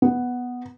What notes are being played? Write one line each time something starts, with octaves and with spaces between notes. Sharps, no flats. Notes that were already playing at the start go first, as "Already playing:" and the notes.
B3